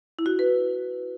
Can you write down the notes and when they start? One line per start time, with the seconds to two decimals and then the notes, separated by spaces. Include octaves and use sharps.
0.19 E4
0.26 F#4
0.39 B4